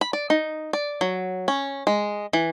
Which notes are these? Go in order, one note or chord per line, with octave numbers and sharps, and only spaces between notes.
B5
D5
D#4
D5
F#3
C#4
G#3
E3